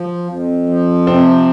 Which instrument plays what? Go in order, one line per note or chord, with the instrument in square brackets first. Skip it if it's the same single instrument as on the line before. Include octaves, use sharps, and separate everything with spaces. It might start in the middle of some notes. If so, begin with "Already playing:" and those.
Already playing: [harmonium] F3
F2
F3
[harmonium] C3 [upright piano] C4